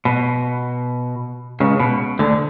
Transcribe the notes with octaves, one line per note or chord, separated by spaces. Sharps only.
B2
C#2 C#3
B2
D2 D3